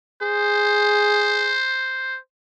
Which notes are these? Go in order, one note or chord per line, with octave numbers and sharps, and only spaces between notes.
G#4 C5